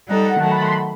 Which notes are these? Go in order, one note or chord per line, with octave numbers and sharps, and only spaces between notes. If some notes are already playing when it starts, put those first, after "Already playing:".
G3 D#4 A4 F#5
F#5
D#3 F#3 A3 A5
B5
C6
B5